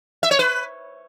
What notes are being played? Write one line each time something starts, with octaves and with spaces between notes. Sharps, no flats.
E5
C#5
B4